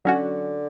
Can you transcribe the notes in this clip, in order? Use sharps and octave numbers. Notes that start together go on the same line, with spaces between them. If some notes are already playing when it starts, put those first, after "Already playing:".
D3 F#3 C#4 F#4